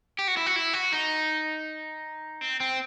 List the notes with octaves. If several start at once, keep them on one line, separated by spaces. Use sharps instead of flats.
G4
F#4
E4
F#4
E4
F#4
D#4
C4
C4